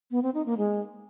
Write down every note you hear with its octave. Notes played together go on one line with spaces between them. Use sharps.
B3
C4
D#4
A#3
G#3